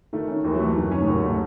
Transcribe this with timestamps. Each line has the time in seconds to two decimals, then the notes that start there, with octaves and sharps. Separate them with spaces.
0.13 D#3 A3
0.28 C#4
0.44 D#2 E3
0.54 F#3
0.60 E3 A3
0.76 F#2 D#3
0.92 C#4
1.02 A2
1.07 D#2 G#2
1.24 A3